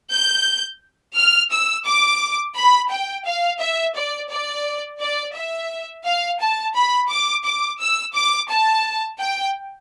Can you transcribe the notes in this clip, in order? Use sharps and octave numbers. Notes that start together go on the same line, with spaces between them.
G6
F6
E6
D6
B5
G5
F5
E5
D5
D5
D5
E5
F5
A5
B5
D6
D6
E6
D6
A5
G5